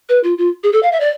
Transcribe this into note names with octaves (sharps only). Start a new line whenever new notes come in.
B4
F4
F4
G#4
A4
F5
E5
D5